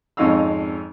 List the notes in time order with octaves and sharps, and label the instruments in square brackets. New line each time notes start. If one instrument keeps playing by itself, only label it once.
[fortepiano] G#1 F2 C#4 D#4 F5 E6